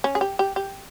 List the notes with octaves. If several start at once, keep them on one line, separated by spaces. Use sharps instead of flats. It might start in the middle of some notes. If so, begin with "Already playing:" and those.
C#4
G#4
G4
G4
G4